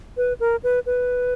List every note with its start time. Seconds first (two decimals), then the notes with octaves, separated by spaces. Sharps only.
0.17 B4
0.40 A#4
0.63 B4
0.86 B4